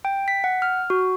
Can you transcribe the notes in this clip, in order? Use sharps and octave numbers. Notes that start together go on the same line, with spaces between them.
G5
B6
F#5
F6
F#4